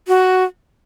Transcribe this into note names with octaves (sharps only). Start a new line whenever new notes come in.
F#4